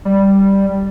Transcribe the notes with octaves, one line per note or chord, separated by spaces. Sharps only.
G3